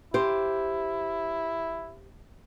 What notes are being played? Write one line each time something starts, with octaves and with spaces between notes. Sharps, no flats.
E4 G4 C5